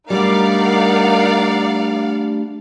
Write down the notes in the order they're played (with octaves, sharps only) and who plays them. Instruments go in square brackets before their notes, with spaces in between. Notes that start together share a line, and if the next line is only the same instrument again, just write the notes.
[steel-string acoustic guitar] G3 [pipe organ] A3 D4 [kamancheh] D#4 A#4 [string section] D5 F5 F#5